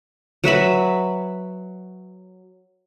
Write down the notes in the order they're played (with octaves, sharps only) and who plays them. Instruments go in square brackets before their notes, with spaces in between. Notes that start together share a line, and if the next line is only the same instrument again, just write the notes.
[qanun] F#3 B4 E5 B5